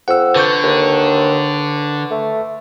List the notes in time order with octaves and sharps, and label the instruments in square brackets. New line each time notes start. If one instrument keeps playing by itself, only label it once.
[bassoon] F2 [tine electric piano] F#5 E6
[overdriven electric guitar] D3 [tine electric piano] B4 C#6 G6
[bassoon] D#2
A3